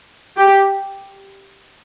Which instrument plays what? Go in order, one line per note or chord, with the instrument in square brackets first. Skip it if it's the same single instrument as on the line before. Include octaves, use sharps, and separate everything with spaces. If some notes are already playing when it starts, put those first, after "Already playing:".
[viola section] G4